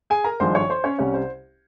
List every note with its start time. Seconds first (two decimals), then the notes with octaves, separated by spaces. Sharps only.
0.10 G#4 G#5
0.24 A#4 A#5
0.40 G#1 G2 F3 G#3 C5 C6
0.55 C#5 C#6
0.70 C5 C6
0.84 C#4 C#5
0.99 C2 C3 G3 C#4 C#5
1.14 C5